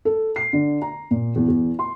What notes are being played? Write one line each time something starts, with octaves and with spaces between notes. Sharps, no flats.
A4
C7
D3
A#5
A#2
E2
E2
C6